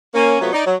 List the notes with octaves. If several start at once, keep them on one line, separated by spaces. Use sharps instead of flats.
A#3 C#4
C3 F#3 A3 B3 F4 F#4
D#4 D5
F#3